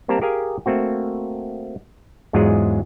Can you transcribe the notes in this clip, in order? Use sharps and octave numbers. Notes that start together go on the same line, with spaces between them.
G3 A#3 C4 G4 A5 A#5
G4 G#4 A#4 F5 G#5
A3 A#3 C4 F#4
E2 G#2 F#3 G#3 F4 G#4